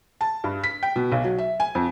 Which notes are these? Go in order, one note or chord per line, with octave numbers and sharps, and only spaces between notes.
A5
G2
B6
G5
B2
B1
F#3
E5
G#5
F2